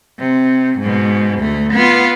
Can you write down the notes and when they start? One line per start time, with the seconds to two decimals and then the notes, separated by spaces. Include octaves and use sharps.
0.19 C3
0.80 G#2 B2
1.39 D2 A3
1.73 B3 F4